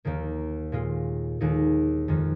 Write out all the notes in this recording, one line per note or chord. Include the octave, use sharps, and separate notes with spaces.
D#2 D#3 A#3
A#2 G#3 F4
D#2 D#3 G#3 D#4 G#4
F2 D#3 G#3